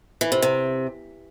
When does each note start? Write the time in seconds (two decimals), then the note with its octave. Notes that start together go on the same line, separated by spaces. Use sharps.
0.21 E3
0.32 C3
0.42 C3